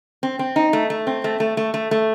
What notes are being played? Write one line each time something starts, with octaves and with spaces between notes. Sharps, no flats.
C4
C4
D#4
A3
A3
C4
A3
A3
A3
A3
A3